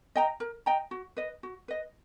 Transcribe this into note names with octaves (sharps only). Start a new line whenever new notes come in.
D#5 G5 A#5
A#4
D#5 G5 A#5
F#4
B4 D#5
F#4
B4 D#5